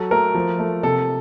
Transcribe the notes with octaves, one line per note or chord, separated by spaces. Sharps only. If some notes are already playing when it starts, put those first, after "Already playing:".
Already playing: F#3 A4
A3 A#4
F3
A3
C3 A4